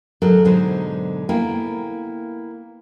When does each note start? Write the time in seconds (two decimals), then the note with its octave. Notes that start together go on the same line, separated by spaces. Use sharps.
0.22 D2 G#2 F#3 D4 A4 A#4
0.45 G#2 B2 D3 F#3 D#4 C5
1.29 A#3 B3 E4 G5 G#5